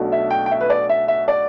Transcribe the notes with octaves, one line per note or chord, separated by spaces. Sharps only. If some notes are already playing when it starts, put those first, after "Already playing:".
Already playing: B1 B2 A3 D4
E5
G5
G5
E5
B4
D5
E5
E5
D5